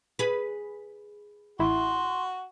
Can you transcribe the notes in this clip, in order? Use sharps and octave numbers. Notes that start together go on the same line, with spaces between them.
G#4 B4
A1 E4 F#4 C6